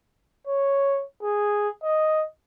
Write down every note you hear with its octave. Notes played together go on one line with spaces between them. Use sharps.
C#5
G#4
D#5